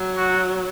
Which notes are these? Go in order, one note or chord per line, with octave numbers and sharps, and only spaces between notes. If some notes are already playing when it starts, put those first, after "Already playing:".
Already playing: F#3
F#4